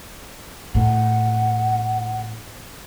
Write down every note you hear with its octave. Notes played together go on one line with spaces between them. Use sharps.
A2 F#5